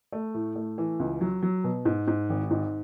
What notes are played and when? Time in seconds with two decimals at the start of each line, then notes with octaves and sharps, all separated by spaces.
0.12 A3
0.34 A2
0.56 A3
0.78 E3
1.00 C#2
1.21 F#3
1.43 F#3
1.64 B2
1.85 G#2
2.08 G#2
2.30 G#1
2.51 G#2